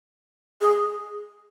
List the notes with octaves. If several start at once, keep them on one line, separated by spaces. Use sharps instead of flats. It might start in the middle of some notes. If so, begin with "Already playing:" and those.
G#4